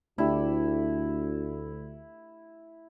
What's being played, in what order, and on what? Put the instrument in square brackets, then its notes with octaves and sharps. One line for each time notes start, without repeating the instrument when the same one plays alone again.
[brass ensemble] D2 [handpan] A3 D4 G4 [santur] E4